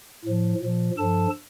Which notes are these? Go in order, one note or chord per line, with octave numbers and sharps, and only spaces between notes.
A2 F3
A#2 F3
G2 F3 A4 A5